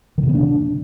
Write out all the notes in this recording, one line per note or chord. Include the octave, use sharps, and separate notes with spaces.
D#3
C3
B3
D4